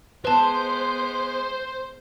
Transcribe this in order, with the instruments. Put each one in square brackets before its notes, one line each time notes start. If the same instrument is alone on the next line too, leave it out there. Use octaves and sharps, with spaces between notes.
[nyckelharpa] G#3 B3 [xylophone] B4 A5 [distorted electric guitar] C5